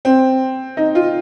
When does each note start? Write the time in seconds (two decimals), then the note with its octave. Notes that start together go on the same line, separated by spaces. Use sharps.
0.05 C4
0.77 D#4
0.95 F4